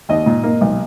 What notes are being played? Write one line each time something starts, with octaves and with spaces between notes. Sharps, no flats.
D#2 D#5
A#2
A#3
B1